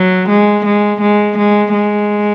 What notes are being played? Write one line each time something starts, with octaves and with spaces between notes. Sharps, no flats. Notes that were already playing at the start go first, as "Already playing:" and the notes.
Already playing: F#3
G#3
G#3
G#3
G#3
G#3